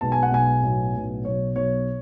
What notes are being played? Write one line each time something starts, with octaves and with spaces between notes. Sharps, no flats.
B1 B2 G#3 B3 A5
G#5
F#5
B1 B2 G#3 B3 G#5
B1 A2 F#3 B3
B1 A2 F#3 B3
B1 B2 F#3 C#5
B1 B2 F#3 C#5